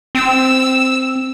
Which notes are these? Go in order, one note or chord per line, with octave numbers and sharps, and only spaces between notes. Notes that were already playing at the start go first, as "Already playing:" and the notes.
C4 E6